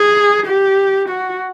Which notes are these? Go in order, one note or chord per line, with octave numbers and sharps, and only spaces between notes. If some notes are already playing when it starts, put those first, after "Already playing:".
Already playing: G#4
G4
F#4